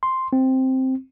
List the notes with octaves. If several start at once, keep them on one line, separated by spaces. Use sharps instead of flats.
C6
C4